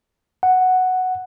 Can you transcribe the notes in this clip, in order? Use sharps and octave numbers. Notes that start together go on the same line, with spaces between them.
F#5